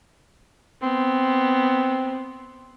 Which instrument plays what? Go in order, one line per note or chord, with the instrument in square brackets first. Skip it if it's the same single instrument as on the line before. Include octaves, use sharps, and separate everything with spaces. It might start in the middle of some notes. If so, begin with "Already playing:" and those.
[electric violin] B3 [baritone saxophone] C4